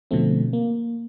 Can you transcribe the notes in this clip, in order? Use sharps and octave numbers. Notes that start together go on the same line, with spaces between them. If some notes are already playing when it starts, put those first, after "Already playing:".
B2 D3 F3 A3 C4
A#3